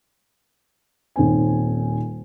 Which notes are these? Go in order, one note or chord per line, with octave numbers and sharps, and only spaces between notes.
D#1 D#3 C4 G#5